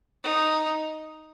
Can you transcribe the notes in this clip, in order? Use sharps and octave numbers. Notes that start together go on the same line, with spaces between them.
D#4